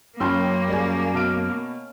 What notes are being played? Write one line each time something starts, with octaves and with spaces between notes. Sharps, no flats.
F#2 A#3 C#4 G5 A5 B5 C6 E6
G3 G#4
B2 F5 A5 D7